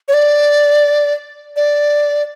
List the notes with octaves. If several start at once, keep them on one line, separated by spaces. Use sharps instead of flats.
C#5
D5
D5